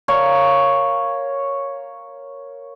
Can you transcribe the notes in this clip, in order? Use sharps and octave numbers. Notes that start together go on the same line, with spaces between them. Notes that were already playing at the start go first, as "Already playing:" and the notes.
A#4 C#5 F5